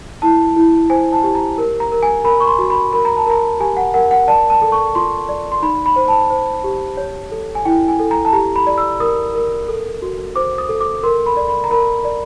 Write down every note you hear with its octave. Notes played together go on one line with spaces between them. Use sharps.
E4 A5
E4
C5 G#5
A5
G4
A#5
A#4
A#5
A#4
G#5
A#4 B5
C#6
C6
F#4
B5
A#4 B5
A#5
A5
A#4 A#5
G4 G#5
F#5
A#4 F#5
F#5
D5 A5
A5
A4
C#6
F4 C6
D5
C6
D#4 B5
B5
C5
A5
C5
G4
C#5
A4
G#5
E4 G5
G#5
A4
A#5
A5
G4 A#5
B5
D5
E6
A#4 D#6
A#4
A4
F#4
C5 D6
D#6
A4
D6
A#4 C6
B5
D5
B5
A#5
A#4 B5
D5